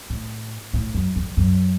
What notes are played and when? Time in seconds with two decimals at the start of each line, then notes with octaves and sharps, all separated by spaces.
0.10 A2
0.74 A2
0.94 F#2
1.16 F2
1.37 F#2